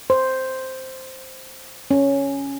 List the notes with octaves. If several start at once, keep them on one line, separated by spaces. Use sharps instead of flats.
C5
C#4